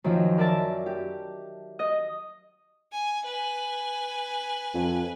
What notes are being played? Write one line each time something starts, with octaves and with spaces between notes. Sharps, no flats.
F#2 D#3 F3
A#4 D5 E5 A5
G4
D#5
G#5
B4 G#5
F2